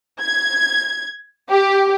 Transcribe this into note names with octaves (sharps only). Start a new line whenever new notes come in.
G#6
G4